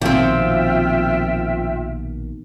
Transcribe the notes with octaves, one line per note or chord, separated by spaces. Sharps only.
A#1 B2 D#3 F3 C4 F4 E5 G5